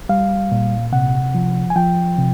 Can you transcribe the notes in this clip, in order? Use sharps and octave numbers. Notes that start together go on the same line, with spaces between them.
G3 F5
A#2
C3 F#5
F3
G#5
F3 G5
C3